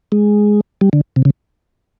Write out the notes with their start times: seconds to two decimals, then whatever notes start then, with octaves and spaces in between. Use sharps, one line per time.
0.12 G#3
0.81 G3
0.93 D3
1.16 C3
1.25 C#3